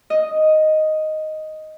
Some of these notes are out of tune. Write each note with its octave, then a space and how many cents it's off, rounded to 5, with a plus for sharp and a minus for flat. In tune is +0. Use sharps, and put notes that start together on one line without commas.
D#5 +0